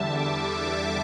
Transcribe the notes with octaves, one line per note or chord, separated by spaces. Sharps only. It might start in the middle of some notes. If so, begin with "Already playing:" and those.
Already playing: E2 D3 G3 E5 A5
A5 D6